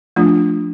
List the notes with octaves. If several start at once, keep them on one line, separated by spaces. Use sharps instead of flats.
F3 A3 D4 F4